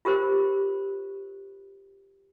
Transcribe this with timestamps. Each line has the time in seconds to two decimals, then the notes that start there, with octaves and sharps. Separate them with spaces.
0.05 F4 G4 A#4 C5